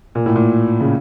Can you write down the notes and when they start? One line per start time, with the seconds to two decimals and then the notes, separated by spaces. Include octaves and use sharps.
0.15 A#2
0.26 A2
0.35 A#2
0.80 C#3